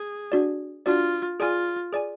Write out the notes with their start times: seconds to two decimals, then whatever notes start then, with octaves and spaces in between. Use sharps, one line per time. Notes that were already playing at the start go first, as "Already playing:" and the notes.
Already playing: G#4
0.32 D4 F#4 D5
0.86 D4 F4 F#4 D5
1.40 F4 G#4 D5 G#5
1.93 G#4 D5 G#5